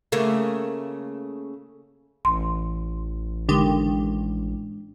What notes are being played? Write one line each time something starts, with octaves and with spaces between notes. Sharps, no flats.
C#3 A3 A#3
A1 C6
D3 D#3 G#3 D4 G4